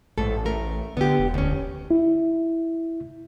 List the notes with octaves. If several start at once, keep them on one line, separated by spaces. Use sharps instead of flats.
A1 G#2 A3 A4
A3 A#4
D3 B3 G4
E1
D2 C#4
E4